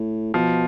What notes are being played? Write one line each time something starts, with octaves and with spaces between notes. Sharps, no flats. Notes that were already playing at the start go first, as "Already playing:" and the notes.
Already playing: A2
B2 F3